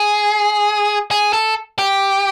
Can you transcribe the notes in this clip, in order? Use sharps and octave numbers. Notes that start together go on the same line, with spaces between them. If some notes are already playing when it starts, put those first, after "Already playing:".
Already playing: G#4
G#4
A4
G4